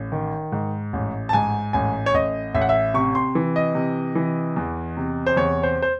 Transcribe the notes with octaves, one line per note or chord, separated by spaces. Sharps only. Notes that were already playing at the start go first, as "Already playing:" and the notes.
Already playing: A1
D#3
G#2
A1
A5
G#2 G#5
A1 G#5
C#5
A1 D#5
A1 E5
F#5
E5
C3 C#6
C6
E3
D#5
C3
E3
E2
C3
C5
E2 C#5
C5
C5